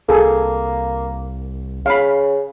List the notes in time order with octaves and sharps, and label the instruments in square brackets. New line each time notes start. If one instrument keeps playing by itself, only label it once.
[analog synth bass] C2 [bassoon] A#3 [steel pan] G#4 A4
[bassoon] C#3 [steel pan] F5 B5